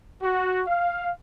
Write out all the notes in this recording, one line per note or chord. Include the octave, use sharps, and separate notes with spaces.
F#4
F5